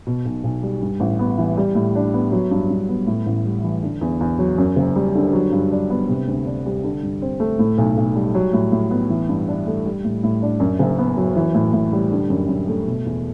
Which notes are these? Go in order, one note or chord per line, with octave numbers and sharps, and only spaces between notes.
B2
B1
B1
G3
G2
A1
B3
E3
G3
A2
D4
B3
F#3
G2
G2
B3
A2
A1
G3
E3
D3
E2
E2
F#3
F#2
F#1
G3
D3
F#3
G2
D4
B3
C3
D2
D4
G3
D3
G2
C4
A3
A2
B1
B1
G3
F#3
A2
A2
B3
E3
G2
D4
A3
G3
A2
A2
D4
F#2
F#1
B3
F#3
E3
A2
A2
G3
D3
F#2
F#2
A3
B2
E2